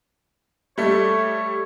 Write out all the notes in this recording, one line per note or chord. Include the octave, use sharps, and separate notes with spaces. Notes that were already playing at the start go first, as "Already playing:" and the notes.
G3 A3 C#5